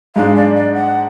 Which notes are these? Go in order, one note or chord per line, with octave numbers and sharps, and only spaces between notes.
G#2 G#3 D4 F5
D5
D5
F#5